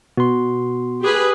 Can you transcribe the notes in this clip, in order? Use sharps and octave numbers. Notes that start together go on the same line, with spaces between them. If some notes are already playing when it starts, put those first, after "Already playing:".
B2 F#4 C6
G4 G#4 B4